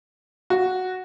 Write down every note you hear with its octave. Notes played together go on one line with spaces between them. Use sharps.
F#4